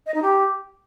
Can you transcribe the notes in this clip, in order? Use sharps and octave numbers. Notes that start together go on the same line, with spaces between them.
D#5
D#4
G4